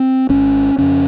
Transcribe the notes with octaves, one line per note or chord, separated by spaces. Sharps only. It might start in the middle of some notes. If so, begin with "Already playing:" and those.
Already playing: C4
G#1 G#2 C#4
F2 C#3 C#4